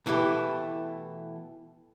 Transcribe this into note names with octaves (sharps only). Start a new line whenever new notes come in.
B2 E3 A3 E4 G4